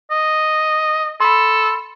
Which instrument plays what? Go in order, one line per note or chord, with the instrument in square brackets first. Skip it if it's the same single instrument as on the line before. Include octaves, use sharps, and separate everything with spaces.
[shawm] D#5
[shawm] A4 [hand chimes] B5 C6